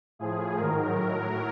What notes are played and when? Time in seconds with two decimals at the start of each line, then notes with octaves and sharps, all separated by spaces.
0.19 A2 F3 G#4
0.57 G#2 D#3 F#3 A#4
0.96 A2 F#3